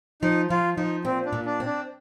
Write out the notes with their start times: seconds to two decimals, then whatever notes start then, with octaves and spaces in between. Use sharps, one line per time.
0.22 F3 D#4
0.50 F3 F4
0.77 F3 D#4
1.05 A#2 C4
1.26 D4
1.33 A#2
1.46 D4
1.60 C4
1.66 D4